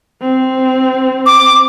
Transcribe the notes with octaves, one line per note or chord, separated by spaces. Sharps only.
C4
D6